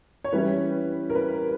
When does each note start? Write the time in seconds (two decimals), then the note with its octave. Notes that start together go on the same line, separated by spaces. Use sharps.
0.24 C#5
0.33 E3 G3 C#4 E4 B4
1.10 A#4
1.15 B4